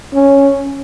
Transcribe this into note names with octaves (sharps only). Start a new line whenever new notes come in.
C#4